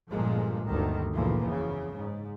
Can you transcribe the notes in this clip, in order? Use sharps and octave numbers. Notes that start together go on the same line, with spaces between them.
G1 A#2 F3 G#3 A#3
G1 D2 D#3
F#1 D2 A#2 E3 F3 A#3
E2 C#3
G#2